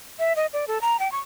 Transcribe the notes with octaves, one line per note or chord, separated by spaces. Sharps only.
E5
D#5
D5
A4
A#5
G5
C#6